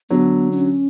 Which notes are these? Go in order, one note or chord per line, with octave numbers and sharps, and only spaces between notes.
D3 F#3 B3
D4
C#4